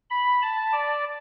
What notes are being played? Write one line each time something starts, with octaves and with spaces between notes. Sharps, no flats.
B5
A5
D5